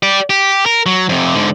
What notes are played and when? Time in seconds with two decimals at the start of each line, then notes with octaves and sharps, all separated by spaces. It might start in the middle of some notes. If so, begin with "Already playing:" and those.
0.03 G4 D5
0.30 G4
0.66 A#4
0.86 F#3
1.09 F2 C3
1.34 G#2 D3